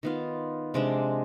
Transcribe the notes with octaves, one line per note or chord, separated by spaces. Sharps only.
D#3 B3 F4
C3 F3 G#3 D4